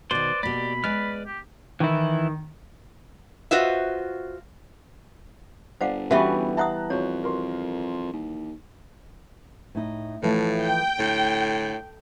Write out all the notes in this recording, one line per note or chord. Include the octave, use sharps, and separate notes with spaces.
B2 D#3 B4 C5 D5 C6
B2 A#3 G4 D5 B5
G#3 B4 D5 F6
G4
D#3 E3 E4
F4 F#4 B4 C5 D#5 E5
G1 C5 D5 F5 F#5
E3 G3 B3 C#4 F#4 E5 F#5
E5 F#5 A5 A#5 D#6 F#6
F2 F#4 C#5
F#4 A#4 C6
D#2
A2 D#4
A2 E3 F3 A3
G5
A2 D3